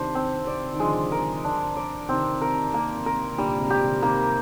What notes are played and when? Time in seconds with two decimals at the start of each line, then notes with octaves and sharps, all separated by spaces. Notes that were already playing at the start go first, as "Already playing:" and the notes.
Already playing: C3 D#3 D4 C5
0.15 C4
0.47 D5
0.74 D#3
0.80 D3 F3 G#3
1.12 A#4
1.44 D4
1.76 D5
2.08 C3 D#3 C4
2.41 A#4
2.74 A#3
3.06 A#4
3.38 A#2 D3 G3
3.59 G#2 C3
3.70 G4
3.81 C3 D#3
4.02 C3 D#3 A#3